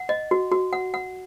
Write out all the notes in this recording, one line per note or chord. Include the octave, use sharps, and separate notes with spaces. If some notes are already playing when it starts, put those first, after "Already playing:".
Already playing: F#5
D#5
F#4
F#4
F#5
F#5